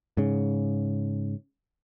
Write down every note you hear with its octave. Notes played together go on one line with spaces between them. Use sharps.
G#2 C#3